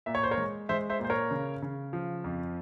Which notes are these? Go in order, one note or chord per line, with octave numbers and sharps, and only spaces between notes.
A#2 E5
C#5
C5
A#4 C#5
G#3
G#3 C5 E5
C5 E5
A#2
C5
A#4 C#5
C#3
C#3
F3
F2